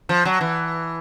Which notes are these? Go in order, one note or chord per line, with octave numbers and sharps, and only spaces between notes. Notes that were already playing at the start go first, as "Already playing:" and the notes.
F3
F#3
E3